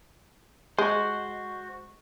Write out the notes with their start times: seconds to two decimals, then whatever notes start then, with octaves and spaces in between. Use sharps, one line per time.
0.78 G#3 F#4 C5